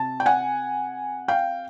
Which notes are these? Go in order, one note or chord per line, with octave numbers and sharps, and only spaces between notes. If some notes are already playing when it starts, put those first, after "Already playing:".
Already playing: C3 A5
G5
F#5 G#5
F5 G5